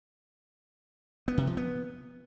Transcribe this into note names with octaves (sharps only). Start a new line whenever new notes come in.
B3
C3
F3
B3